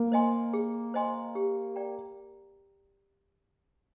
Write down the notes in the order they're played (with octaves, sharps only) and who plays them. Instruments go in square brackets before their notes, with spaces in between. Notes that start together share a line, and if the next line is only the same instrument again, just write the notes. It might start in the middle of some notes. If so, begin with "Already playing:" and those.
Already playing: [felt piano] A#3
[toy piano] C5 D#5 G#5 C6
G#4
C5 D#5 G#5 C6
G4
D5 G5 A#5